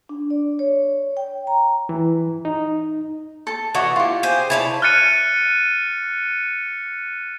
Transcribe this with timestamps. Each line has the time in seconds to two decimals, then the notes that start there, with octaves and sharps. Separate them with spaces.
0.09 D4
0.30 D5
0.59 C#5
1.17 G5
1.47 A#5
1.89 E3
2.45 D#4
3.47 A4 A5
3.75 E3 F#4 D5 D#5
3.96 F4 G4
4.23 G#4 C5
4.50 E4 C#5 D5 A5
4.82 F6 F#6 A6 C#7 D#7